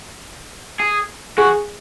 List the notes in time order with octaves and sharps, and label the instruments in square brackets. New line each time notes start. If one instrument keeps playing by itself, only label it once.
[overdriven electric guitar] G#4
[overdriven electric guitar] F#4 [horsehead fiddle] G#4